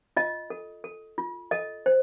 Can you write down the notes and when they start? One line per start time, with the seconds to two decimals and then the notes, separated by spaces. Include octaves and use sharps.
0.17 F4 D#5
0.50 A4
0.84 A4
1.18 F4
1.51 A4 D#5
1.86 C5